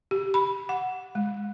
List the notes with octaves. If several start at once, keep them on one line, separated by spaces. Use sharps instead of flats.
G4
B5
F#5
G#3